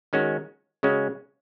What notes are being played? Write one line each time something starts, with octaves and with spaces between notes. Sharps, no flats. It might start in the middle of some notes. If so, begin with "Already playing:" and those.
D#3 G#3 C#4 F#4
C#3 G#3 C#4 F#4